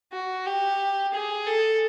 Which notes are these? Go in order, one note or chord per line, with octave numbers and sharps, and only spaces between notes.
F#4
G4
G#4
A4